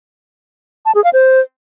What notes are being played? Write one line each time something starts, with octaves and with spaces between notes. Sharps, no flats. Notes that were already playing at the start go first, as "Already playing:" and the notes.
A5
G#4
F5
C5